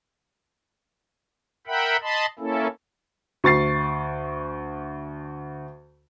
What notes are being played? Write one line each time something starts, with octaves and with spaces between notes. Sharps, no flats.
A#4 E5 F#5 G5 B5
D#5 A5 B5 C6
A#3 C#4 E4 A4
D2 C#6 A6 C7